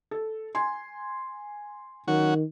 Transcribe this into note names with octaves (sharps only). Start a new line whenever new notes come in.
A4
G#5 C6
D#3 F#3 C#4 F#4